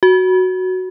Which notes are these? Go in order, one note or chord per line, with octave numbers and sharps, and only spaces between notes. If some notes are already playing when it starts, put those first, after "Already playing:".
F#4